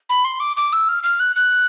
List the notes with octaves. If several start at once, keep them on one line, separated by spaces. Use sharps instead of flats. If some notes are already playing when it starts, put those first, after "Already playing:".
B5
C6
D6
D6
E6
F6
F6
F#6
F#6